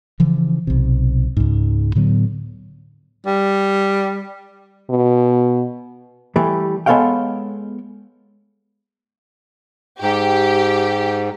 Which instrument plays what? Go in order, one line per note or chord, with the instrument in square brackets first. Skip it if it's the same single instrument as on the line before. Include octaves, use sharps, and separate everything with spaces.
[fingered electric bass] C#3 E3 F3
B1 C3
C#2 G#2
A2 D3 F#3 B3
[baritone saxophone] G3
[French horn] B2
[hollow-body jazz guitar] E3 G3 A3
G#3 B3 A4 C#5 F5 G5
[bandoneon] G#2 [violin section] G4